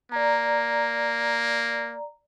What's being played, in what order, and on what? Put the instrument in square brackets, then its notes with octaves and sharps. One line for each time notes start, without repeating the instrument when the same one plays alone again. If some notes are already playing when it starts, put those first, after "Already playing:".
[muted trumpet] A#3 [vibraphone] D5 A#5